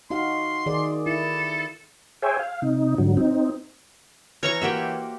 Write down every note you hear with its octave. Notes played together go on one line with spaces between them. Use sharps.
D#4 F#4 F5 C6
D#3 G#4 D5
E4 A4
G#4 C5 C#5 E5 G5 G#5
F5
C3 D#4
G#2 D3 F#3
C4 D#4
E3 C#4 C#5 A#5 C#6
A#3 F#4 G4 C5 E5